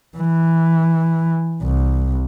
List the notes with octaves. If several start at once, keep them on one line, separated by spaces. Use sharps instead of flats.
E3
C2